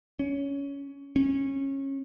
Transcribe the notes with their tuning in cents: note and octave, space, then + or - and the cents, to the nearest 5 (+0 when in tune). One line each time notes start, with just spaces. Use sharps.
C#4 +15
C#4 -20